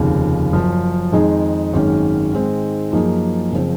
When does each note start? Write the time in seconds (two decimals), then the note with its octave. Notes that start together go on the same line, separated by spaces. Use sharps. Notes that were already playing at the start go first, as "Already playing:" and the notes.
Already playing: F1 D#2 C#3 F3
0.53 F#1 F#2 F3
1.12 F2 D#3 G#3 D#4 G#4
1.73 G#1 F#2 D#3 G#3 C#4
2.32 G#2 D#3 G#3 C4
2.92 F#2 F3 A#3 D#4 G#4
3.52 F#1 C#3 F3 C4